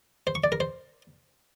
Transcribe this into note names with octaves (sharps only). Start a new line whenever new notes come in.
C5
C#6
D5
A#4
C5